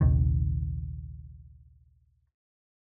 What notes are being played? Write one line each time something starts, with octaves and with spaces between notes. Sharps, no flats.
A#1 D#2 C3 D#3